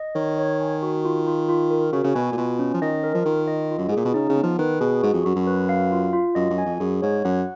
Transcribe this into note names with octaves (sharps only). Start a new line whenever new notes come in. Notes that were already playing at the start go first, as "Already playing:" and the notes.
Already playing: D#5
D#3 C#5
C#5
G#5
F#4
F4
F4
F4
A#4
C#3 F#4
C#3
B2 G#5
A#2
B2 F4
C#4
F3
D#3 D#5
A#4
F3
D#3 F4
D#5
F4
F#2
G#2
A#2 G#4
B2
C#3 D#4
C#3
B3
F3
D#3 B4
B2 G#4
G#2 F#4
F2
F#2 F#4
F#2
B4
F5
F4
F4
F#2 D#5
F#2
G#5
F2
F#2 G#4
G#2 C#5
F#2 F#5